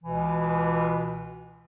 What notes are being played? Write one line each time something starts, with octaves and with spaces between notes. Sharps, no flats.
C#2 B2 E3